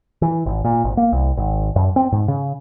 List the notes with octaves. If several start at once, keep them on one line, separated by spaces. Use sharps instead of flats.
E3
G#1
A#2
G#1
A#3
C2
G#1
F#2
C4
G#2
C#3